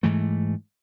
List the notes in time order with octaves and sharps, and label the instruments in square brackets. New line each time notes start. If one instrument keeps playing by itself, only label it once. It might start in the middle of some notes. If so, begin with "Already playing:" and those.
[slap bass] G#2 E3 A3